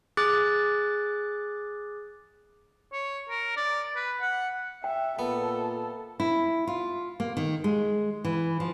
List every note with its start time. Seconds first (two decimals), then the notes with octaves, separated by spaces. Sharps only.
0.17 G#4 D6 F#6 A6
2.93 C#5
3.30 A#4
3.57 D5
3.96 B4
4.21 F#5
4.84 E5 G5
5.19 A#2 B3 A4
6.20 E4
6.67 F4
7.20 A#3
7.37 D#3
7.64 G#3
8.25 E3
8.60 F3